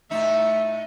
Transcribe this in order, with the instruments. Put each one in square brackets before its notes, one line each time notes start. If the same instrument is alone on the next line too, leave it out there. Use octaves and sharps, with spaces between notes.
[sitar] A2 D#4 [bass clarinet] A3 [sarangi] E5